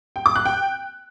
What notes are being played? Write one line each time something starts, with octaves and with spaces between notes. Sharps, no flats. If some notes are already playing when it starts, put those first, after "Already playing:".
G5
D6
F#6
G5